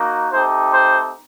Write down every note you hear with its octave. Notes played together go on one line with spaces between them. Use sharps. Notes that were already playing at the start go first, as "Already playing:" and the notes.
Already playing: A#3 D#4 F#4
A3 C4 D#4 G4 C5
C5